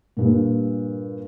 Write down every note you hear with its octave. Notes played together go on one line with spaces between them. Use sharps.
G2 A#2